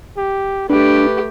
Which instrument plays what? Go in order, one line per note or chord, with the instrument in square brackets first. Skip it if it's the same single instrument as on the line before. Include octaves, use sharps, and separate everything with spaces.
[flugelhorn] G4
[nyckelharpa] A3 G4 [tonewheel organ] D4 [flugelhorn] B4